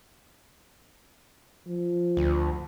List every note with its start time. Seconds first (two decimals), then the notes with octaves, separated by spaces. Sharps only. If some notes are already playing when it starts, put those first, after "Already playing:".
1.67 F3
2.17 D2